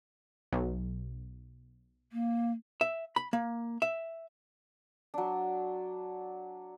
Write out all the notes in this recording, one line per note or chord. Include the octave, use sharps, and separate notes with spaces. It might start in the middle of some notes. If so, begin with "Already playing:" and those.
B1
A#3
E5
B5
A#3
E5
F#3 D4